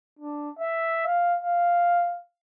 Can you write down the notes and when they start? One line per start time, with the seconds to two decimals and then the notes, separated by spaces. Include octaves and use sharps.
0.19 D4
0.59 E5
1.06 F5
1.44 F5